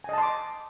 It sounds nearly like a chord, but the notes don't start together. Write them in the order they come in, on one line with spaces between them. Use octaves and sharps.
G#5 D#5 A5 C6 D6